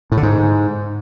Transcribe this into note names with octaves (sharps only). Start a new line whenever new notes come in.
A2
D3
G#2